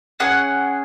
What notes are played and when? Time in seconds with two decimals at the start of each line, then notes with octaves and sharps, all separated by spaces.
0.20 C#4 G#4 F#5